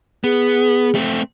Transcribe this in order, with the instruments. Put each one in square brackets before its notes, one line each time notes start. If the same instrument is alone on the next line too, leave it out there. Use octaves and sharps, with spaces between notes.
[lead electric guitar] B3 [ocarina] G#4
[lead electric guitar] A3 C4